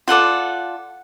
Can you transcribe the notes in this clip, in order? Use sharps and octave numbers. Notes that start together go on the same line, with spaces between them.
F4 A4 D5 F#5